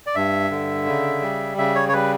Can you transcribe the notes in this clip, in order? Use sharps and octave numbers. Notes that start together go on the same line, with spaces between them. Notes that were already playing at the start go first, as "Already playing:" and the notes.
D5
G2 E5
D3
C#3
G3
C#3 E5
C#5
C#5
G3 B4